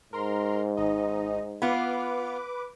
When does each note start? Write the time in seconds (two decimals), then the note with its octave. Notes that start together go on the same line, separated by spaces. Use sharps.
0.13 G#2 A#4 A#5 C6
0.77 G#1 D#4 D#5
1.62 B3 F4 B4 D6